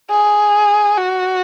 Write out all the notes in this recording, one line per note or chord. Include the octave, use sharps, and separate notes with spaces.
G#4
F#4